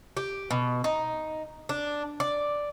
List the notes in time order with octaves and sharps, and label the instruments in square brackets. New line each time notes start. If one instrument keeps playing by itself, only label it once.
[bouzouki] G4
B2
D#4
D4
D5